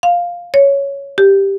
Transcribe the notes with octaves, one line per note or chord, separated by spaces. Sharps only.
F5
C#5
G4